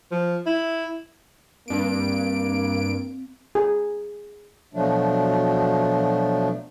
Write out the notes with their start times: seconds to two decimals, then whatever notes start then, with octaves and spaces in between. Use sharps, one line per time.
0.12 F3
0.47 E4
1.68 G2 A#3 C4 D7
3.55 G#4
4.74 B2 F3 F#3 A3 D4